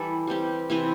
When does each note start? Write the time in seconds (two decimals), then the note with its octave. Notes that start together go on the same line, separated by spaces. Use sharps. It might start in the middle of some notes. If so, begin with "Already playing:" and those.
Already playing: E3 G3 E4 A4
0.27 G3 C4 G4
0.70 C3 E3 C4 E4